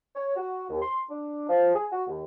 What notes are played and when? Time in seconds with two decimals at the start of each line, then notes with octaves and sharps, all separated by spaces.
0.15 C#5
0.36 F#4
0.70 D#2
0.82 C6
1.10 D4
1.49 F3
1.74 G#4
1.92 F#4
2.07 D#2